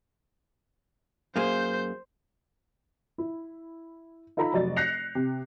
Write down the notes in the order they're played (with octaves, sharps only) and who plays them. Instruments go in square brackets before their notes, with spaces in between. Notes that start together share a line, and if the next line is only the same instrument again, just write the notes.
[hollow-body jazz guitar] F#2 A#3 G#4 [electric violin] C5 G6
[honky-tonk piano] E4
D#4 F4 A4 A#5 B5
F1 F#3 D5 D#5 A6
F#6 G6 A#6 C7 C#7 F7
C3